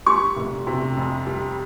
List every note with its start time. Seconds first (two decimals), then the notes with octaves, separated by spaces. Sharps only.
0.06 G3 C#6
0.36 F1
0.67 C3
0.97 F2
1.27 G3